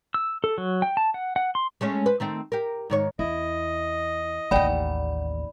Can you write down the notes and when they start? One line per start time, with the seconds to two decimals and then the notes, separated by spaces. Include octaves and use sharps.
0.14 E6
0.44 A4
0.58 F#3
0.82 G5
0.97 A5
1.14 F#5
1.36 F#5
1.55 C6
1.81 G#3 A3 C#4
2.06 B4 C5
2.20 D#3 A3 C4
2.52 G4 A#4
2.90 G#2 D#3 C#5
3.19 E2 E4 D#5
4.51 A1 D#2 D5 F#5 G5 B5